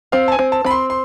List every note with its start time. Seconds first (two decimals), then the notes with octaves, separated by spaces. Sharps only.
0.12 C4 F5
0.28 A5
0.32 G#5
0.39 C4
0.52 A5
0.65 C4 B5
0.71 C6
0.90 C6